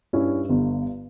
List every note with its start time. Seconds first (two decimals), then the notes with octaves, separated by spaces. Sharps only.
0.13 G2 C#4 E4
0.49 G1